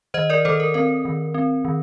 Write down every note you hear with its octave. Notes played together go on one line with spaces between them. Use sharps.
D#3 C5 D#5
A#4 D5
D#3 A4 C5
A#4
C4 A#4
D#3
C4
D#3